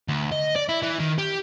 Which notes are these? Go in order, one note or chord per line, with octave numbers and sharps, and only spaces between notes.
D2
D#5
D5
E4
E3
D#3
G4